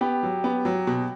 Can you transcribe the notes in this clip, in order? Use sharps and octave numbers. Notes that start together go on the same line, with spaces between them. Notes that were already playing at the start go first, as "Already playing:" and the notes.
B3 G4
F#3
B3
F#3
B2